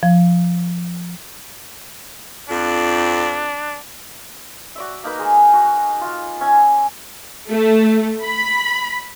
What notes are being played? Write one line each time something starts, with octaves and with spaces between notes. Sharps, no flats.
F3
F2 D4
F#4 D5 E5
A#3 D#4 A#4 B4
G#3 G#4
F#4
F4
C#4 E5 G#5
A3
B5